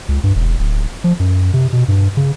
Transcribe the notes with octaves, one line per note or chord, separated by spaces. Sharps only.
C#2
G2
E1
D1
F3
F#2
C3
B2
G2
C#3